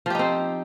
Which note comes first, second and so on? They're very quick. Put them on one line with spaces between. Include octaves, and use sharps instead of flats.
F3 G4 D#4 C4